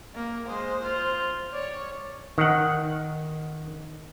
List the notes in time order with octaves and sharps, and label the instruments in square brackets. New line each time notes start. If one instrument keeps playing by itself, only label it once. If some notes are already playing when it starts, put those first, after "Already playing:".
[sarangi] A#3
[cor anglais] G#3 [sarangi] C5
[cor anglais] F4
[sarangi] C#5 [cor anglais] D5
[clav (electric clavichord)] D#3 F#5